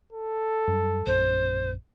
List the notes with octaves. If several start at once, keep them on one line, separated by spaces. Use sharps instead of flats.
A4
F#2 G3
A#1 F#2 C#4 C5